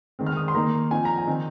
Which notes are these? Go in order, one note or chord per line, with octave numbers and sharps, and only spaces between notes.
D#3 G#3 C4
F6
D#6
C6
D#3 A#3 D#4 A#5
F3 C4 D#4 G#5
A#5
G#5
D#3 C4 D#4